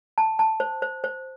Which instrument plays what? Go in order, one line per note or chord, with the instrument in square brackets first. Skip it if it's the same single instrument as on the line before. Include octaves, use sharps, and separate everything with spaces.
[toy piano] A5
A5
C5
C5
C5